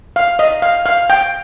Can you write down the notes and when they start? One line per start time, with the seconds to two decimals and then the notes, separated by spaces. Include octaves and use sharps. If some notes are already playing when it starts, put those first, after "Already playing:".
0.16 F5
0.39 D#5
0.62 F5
0.86 F5
1.10 G5